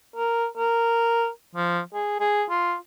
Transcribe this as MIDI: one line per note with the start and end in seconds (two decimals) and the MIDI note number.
0.16 0.46 70
0.57 1.28 70
1.55 1.80 53
1.94 2.16 68
2.20 2.44 68
2.50 2.75 65